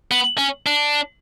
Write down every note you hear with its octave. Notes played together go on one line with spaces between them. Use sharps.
B3
C#4
D4